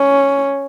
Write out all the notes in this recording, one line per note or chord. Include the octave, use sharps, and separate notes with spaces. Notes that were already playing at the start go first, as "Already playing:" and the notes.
Already playing: C#4